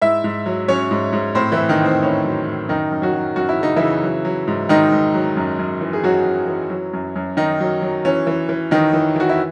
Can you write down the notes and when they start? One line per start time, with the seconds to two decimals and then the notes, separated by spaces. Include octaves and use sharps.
0.02 G#2 E4 E5
0.24 G#2
0.46 F#3
0.68 F#3 C#4 C#5
0.91 G#2
1.13 G#2
1.35 A2 C4 C5
1.52 E3 E4
1.57 A2
1.69 D#3 D#4
1.81 A2 C4
2.02 A2 C#4
2.24 F#3
2.47 A2
2.69 F#2 D#3 D#4
2.91 F#2
3.02 F#3 F#4
3.13 F#3
3.36 F#2 F#4
3.49 E4
3.59 C#3 D#4
3.76 C#3 E3 E4
4.03 F#3
4.25 F#3
4.47 G#2
4.69 G#2 D#3 D#4
4.92 G#2
5.14 F#3
5.37 F#2
5.59 F#2
5.81 E3
5.93 G#4
6.04 F#2 F#3 F#4
6.26 F#2
6.48 E3
6.70 F#3
6.93 F#2
7.16 F#2
7.37 D#3 D#4
7.60 F#3
7.82 F#3
8.05 E3 C#4
8.27 E3
8.49 E3
8.71 D#3 E3 D#4
8.93 E3
9.16 E3 F#4
9.29 E4